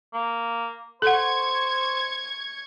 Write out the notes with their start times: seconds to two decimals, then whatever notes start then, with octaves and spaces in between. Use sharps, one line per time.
0.14 A#3
1.02 A4 C5 F#5 C#6 G#6